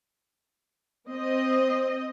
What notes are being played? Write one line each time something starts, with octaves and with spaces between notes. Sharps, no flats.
C4 D#5